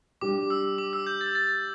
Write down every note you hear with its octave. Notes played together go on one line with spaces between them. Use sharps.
G3 D4 G4 D6
E6
D6
E6
G6
A6
A6